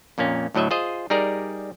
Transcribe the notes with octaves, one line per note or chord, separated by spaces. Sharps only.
F2 A#2 A#3 C#4
D2 A2 F#3 D#5 E5
F4 G#4 C5 D#5
G3 D#4 G#4 A#4 D5